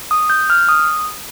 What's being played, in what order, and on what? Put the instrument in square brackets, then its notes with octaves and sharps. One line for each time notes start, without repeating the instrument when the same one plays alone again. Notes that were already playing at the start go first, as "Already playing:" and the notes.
[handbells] D#6
G6
F6
D#6